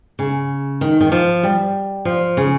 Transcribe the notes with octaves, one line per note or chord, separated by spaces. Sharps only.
C#3
D#3
D#3
F3
G3
F3
C#3